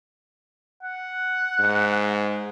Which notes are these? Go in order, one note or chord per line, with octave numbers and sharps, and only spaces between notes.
F#5
G#2